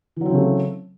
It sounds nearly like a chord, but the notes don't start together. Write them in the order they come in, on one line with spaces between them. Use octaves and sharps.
E3 F#3 C4 C#3 A3